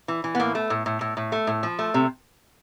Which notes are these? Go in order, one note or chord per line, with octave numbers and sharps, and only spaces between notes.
E3
E3
B3
A2 A#3
A3
A2
A2
A2
A2
A3
A2
F3
A3
C3